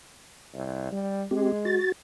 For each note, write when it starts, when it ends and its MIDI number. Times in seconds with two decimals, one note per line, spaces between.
0.54 0.89 36
0.91 1.25 55
1.31 1.79 56
1.31 1.52 60
1.31 1.52 67
1.65 1.92 66
1.65 1.92 93